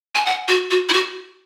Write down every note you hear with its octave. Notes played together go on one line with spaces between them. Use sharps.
G#5
F#5
F#4
F#4
E4
F#4